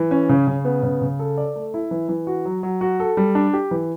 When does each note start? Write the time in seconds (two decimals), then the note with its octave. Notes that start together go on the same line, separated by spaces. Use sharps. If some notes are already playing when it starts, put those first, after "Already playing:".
Already playing: E3
0.11 C#4
0.29 C#3
0.47 C#3
0.65 B3
0.83 C#3
1.02 C#3
1.19 A4
1.38 D5
1.56 A3
1.74 E4
1.91 E3
2.09 E3
2.27 F#4
2.45 F#3
2.63 F#3
2.81 F#4
3.00 A4
3.17 G3
3.35 D4
3.53 G4
3.71 E3